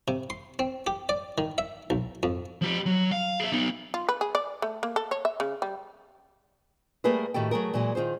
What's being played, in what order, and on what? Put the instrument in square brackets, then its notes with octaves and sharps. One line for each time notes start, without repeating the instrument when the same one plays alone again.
[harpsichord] C3
C6
C4
G4
D5
D#3
E5
B1
F2
[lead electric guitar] F3 G4
F#3
F5
G#4 E5
B3 D#4
[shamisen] F4
B4
G#4
D5
A3
A#3
A4
C#5
E5
C#3
G3
[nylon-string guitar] G3 A3 A#3 G#4 A#4 B4
A2 D#3 F#4 G4 A4 G5
F#3 A3 G#4 A#4
A#2 E3 F#3 G#3
D#3 F4 G#4 C5